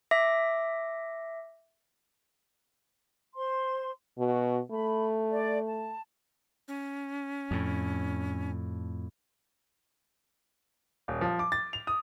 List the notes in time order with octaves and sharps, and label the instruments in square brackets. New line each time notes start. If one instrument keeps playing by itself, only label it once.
[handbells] E5 D6 A#6
[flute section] C5 C6
[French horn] B2 [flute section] F#4
[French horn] A3 [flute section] B5
[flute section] D5
A5
[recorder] C#4
[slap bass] F2 A2
[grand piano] D#1
F3
D6
A6
F7
D#6